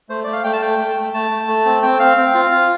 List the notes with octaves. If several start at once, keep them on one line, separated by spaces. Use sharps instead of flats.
A3 C5
A3 D5
F5
A3 G5
A5
A3 G5
A3
A3
A3 A5
A3
A3
C4
C4 G5
C4 F5
C4
F4
F4